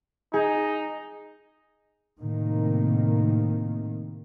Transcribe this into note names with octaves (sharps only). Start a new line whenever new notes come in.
D#4 G#4
A2 C3 D#3 A#3